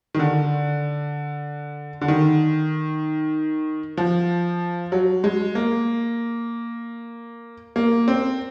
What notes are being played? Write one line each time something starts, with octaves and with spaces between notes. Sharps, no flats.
D#3
D3
D3
D#3
F3
F#3
G#3
A#3
A#3
C4